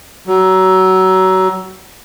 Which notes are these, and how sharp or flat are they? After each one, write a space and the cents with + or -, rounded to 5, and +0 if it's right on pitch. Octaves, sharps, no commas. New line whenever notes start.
F#3 +25